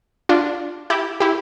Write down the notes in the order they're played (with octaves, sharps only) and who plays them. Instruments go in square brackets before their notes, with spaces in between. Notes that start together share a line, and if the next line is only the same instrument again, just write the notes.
[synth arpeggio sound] D4 F4
E4 G4
E4 G4